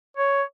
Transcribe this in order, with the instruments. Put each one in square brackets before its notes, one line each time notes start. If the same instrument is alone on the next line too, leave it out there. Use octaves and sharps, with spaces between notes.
[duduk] C#5